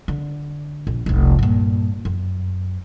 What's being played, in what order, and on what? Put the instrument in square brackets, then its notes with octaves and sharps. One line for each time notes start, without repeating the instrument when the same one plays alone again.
[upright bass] D3
A#1
F1 C2
G2 A#2
F#2